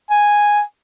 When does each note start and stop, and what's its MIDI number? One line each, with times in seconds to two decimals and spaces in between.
0.10 0.61 80